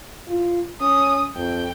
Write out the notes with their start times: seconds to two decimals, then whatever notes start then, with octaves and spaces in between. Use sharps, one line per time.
0.28 F4
0.81 C#4 D#6
1.36 F2 G5